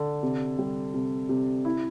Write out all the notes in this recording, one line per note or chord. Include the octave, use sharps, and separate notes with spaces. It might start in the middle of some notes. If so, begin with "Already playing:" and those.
Already playing: D3
C3
G3
C3
C3
E4